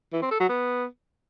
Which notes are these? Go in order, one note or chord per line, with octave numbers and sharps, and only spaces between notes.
E3
C4
A4
F#3
B3